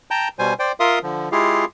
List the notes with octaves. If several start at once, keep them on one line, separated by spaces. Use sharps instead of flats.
G5 A5 A#5 G6
B2 G3 C5 G#5
C5 D5 G5
F4 A#4 E5 F5 C6 D#6
D3 F3
G#3 E4 F4 G4 G#4 F5